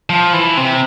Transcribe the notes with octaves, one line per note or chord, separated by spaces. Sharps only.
F3
E3
C3